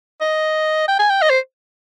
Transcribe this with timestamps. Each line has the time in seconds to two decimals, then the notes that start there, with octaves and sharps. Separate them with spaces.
0.21 D#5
0.88 G5
0.99 G#5
1.10 G5
1.22 D#5
1.30 C5